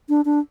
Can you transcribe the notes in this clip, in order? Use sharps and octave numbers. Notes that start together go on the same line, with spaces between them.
D4
D4